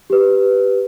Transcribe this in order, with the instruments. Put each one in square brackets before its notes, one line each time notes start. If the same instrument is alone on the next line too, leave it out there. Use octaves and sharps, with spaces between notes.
[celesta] G4 B4